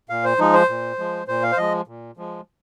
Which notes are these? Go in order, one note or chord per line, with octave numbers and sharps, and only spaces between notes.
A#2 F5
C5
F3 G#3 D#4
C5
A#2
F3 G#3
A#2 C5
F5
C5
F3 G#3 D#5
A#2
F3 G#3